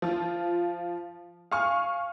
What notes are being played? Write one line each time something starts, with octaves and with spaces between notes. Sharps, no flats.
F3 F4
F5 G#5 C#6 F6